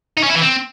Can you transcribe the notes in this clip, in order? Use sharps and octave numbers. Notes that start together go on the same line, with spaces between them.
D#4
C#4
E4
E3
C4